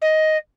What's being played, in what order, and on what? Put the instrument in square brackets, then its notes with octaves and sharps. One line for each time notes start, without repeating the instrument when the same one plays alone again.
[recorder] D#5